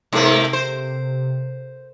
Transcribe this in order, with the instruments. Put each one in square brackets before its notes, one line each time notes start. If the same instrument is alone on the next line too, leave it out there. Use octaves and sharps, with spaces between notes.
[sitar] G#2 A3 A#3 [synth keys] C3
[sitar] C5